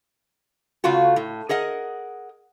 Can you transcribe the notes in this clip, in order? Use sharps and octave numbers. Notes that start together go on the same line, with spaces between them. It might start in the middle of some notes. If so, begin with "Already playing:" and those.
C#3 A3 F4 F#4
A2
G#4 A#4 D#5 F#5